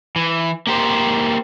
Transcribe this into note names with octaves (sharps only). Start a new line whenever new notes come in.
E3
A#3 G4 C5